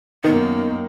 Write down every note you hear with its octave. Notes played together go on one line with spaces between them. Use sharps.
F#2 D#3 A#3 B3 D#4